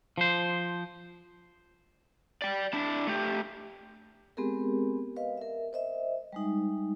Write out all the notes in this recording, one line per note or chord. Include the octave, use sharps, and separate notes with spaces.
F3 C5
D5 G5
D4 E4
A3 G4
G#3 B3 C4 G4 G#4 A#4
B4 D#5 F5
A#4 E5
C5 D#5 E5
G3 G#3 D#4